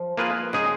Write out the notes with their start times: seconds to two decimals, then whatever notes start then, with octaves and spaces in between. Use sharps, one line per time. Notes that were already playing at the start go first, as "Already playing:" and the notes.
Already playing: F3
0.17 A#3 F4 G#4 B4
0.53 C#3 G#3 D#4 G#4